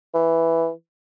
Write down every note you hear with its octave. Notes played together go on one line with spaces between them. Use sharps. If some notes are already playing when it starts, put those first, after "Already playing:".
E3